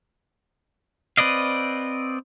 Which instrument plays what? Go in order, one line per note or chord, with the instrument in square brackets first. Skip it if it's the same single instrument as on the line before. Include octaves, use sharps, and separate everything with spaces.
[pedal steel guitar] C4 B4 D5 D#5 F5